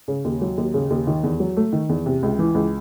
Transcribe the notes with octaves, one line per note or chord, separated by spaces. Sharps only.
C#3
D#2
F#3
D#2
C#3
D#2
D#3
E2
F#3
A3
D#3
E2
C3
C#2
E3
C#2